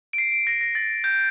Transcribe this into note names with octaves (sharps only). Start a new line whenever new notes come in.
D7
C7
D7
A#6
A#6
A6
G6